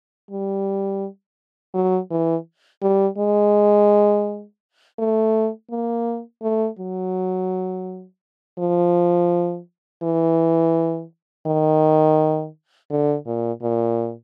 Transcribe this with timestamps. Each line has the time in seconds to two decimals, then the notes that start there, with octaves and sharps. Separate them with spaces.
0.31 G3
1.74 F#3
2.10 E3
2.82 G3
3.18 G#3
4.99 A3
5.71 A#3
6.42 A3
6.79 F#3
8.58 F3
10.03 E3
11.46 D#3
12.90 D3
13.26 A#2
13.62 A#2